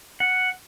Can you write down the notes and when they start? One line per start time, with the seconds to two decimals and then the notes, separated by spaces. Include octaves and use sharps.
0.20 F#5